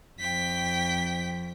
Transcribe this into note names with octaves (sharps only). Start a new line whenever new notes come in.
F2 F3 G5 B6